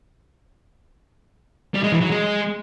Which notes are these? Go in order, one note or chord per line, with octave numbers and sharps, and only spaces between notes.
G3
G#3
E3
F#3
G#3